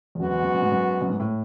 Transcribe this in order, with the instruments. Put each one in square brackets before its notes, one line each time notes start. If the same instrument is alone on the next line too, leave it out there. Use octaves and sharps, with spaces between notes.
[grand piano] E2
[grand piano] F#2 [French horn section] G#3 B3 F#4
[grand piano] E2
F#2
F#2
G#2
F#2
F#2
G#2
A2